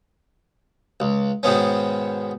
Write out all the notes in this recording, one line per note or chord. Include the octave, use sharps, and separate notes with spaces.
C#2
G#2 B2 D#3 B3 C#4